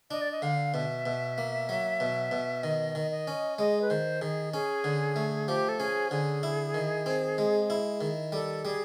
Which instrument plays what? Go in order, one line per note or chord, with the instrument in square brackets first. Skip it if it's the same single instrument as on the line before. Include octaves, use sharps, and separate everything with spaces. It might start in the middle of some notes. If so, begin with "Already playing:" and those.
[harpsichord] D4 [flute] D#5
[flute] D5
D#5
[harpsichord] D3 [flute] F5
[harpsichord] B2 [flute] E5
[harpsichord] B2
A#3
F#3
B2
B2
[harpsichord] D#3 [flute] D#5
[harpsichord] D#3
[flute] D#5
[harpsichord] C#4
[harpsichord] G#3 [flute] D#5
[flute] B4
[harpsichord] D#3 [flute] C5
[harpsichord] D#3 [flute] G#4
[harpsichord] C#4 [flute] G#4
[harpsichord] D3
A3
[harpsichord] F3 [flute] G4
[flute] A4
[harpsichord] C#4 [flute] G#4
[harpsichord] D3 [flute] G#4
[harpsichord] E4
D#3
C4
G#3
E4
D#3
[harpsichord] G3 [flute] A4
[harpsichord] G3 [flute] G#4